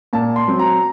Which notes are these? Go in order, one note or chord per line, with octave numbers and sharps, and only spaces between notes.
A#2 A5
C6
F#3 C4
A#5